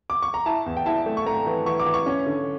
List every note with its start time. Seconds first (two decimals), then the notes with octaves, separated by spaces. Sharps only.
0.10 D6
0.22 C#6
0.34 A#5
0.46 E4 A5
0.66 E2
0.77 G5
0.86 E4 A5
1.06 A3
1.17 C#6
1.26 A3 A#5
1.46 E3
1.66 E3 C#6
1.80 D6
1.86 E3
1.94 C#6
2.06 C#4
2.27 D3